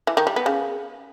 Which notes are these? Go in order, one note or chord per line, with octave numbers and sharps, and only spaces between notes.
E3
D#3
G3
B3
C#3